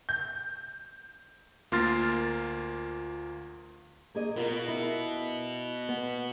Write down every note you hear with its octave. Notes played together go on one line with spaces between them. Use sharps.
G6
D2 A#3 F4 C6 F6 A6
A#3 G#4 D#5
B2 F4 A#4
E4
B3